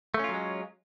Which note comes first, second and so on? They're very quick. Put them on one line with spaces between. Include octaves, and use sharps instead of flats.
A3 C#4 F4 F#3 G#3